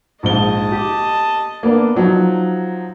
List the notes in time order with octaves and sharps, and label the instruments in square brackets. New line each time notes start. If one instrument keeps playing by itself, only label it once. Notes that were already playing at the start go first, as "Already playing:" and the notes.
[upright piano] A#1 G#2 G7 [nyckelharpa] D#5 A5
[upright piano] G4
A#3 B3 D4
F3 F#3 D#4